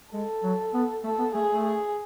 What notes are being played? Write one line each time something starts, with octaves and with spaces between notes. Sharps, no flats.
G#3 A4
F#3
B3
A3 A4
B3
A3 G#4
A3
G#4